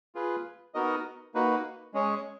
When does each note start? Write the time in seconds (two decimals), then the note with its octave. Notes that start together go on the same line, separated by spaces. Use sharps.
0.15 F4 G#4 B4
0.74 B3 D#4 F#4 A#4 D#5
1.34 A#3 D#4 F#4 B4
1.94 G#3 C#4 G#4 C#5